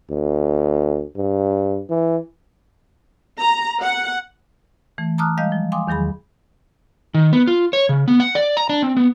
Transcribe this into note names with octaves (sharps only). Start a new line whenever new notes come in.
D2
G2
E3
A#5
F#5
E3 A3
A5 A#5 D6 D#6 F6 F#6
G3 G#3 D#5 F5 G6
F3
F5 G5 G#5 C6 D6 D#6
E2 D#3 F#3 G#4 B5
D#3
B3
F4
C#5
C#3
B3
F#5
D5
A#5
D4
C4
B3